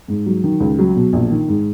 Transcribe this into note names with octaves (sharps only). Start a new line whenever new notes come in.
G#2
F#3
D#3
C#2
F#3
B2
A#1
D#3
G#2